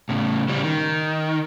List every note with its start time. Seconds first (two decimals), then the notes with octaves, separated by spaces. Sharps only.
0.09 A2 C#3
0.48 C#3 G3
0.64 D#3